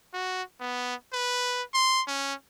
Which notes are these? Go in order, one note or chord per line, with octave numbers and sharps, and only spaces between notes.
F#4
B3
B4
C6
C#4